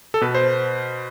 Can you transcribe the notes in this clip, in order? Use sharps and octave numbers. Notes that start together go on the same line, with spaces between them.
A4
B2 B4
C5